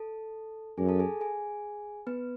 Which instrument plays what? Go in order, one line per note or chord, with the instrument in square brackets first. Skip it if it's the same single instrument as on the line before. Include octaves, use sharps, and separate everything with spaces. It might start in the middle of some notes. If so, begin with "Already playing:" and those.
Already playing: [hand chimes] A4 A5
[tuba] F#2 [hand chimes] G#4 G#5
[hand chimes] A4 A5
G#4 G#5
G#4 G#5
B3 B4